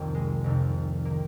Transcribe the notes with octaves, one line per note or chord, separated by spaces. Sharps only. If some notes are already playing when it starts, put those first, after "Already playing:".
Already playing: F1 C2 F2 C3 D#3 A#3
G#3
F1 F2 C3 D#3
A#3
D#3